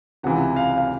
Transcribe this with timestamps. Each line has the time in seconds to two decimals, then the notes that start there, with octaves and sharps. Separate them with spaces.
0.23 C#2 C3 E3 F#5
0.56 F5
0.78 F5